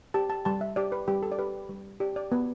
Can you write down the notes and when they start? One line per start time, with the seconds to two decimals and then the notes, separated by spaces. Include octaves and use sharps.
0.14 G4 A5
0.30 A5
0.45 G3 A5
0.61 E5
0.76 G4 D5
0.92 B4
1.08 G3 G4
1.23 A4
1.32 D5
1.39 G4 B4
1.69 G3
2.00 G4 D5
2.16 D5
2.32 B3 B4